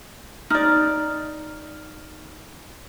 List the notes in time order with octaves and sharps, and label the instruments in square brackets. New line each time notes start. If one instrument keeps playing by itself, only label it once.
[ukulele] D#4 D5 [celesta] F6